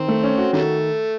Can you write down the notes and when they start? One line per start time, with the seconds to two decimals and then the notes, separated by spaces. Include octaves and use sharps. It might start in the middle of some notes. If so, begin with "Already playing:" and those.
Already playing: D#3 C4
0.08 A3
0.23 C#4
0.38 F#4
0.53 C3 D#3 F#3 A3